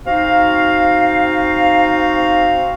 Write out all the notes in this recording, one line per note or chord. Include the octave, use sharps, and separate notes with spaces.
C4 D#4 F#4 F5